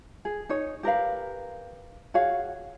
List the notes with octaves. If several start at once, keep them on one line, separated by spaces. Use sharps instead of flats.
G#4
D#4 C#5
G4 A#4 B4 F5
F#4 G#4 C#5 F5